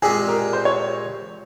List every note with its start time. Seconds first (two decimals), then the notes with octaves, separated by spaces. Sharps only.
0.02 A#2 G#3 C4 G4 G#4
0.28 A#4
0.53 C5
0.65 C#5